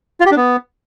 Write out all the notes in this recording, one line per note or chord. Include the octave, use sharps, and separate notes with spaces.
F4
G4
D4
B3